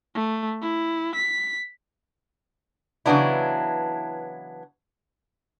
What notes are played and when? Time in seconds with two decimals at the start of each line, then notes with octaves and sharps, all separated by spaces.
0.15 A3
0.62 E4
1.15 B6
3.06 C#3 E3 F#3 B3 D4 E4